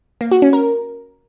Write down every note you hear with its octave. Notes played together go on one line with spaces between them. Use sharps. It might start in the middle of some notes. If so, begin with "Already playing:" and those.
A#3
F#4
C#4
A#4